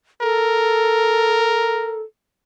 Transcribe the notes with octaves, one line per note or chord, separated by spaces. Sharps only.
A4 A#4